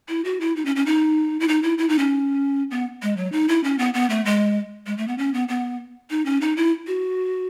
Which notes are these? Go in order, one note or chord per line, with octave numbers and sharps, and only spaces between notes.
E4
F#4
E4
D#4
C#4
C#4
D#4
E4
D#4
E4
E4
D#4
C#4
B3
G#3
F#3
D#4
E4
C#4
B3
B3
A3
G#3
G#3
A3
B3
C#4
B3
B3
D#4
C#4
D#4
E4
F#4